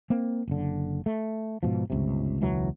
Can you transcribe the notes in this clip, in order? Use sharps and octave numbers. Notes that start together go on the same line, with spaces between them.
A#3 C4
F#1 D3
A3
G#2 B2 F3
G1 C#2 C3
E1 C#2 E3 F#3